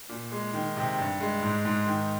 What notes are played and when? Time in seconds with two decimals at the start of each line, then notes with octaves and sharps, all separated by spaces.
0.09 A#2
0.32 G#3
0.54 D#3
0.77 C3
0.98 G2
1.21 G#3
1.43 G#2
1.65 G#2
1.87 D#3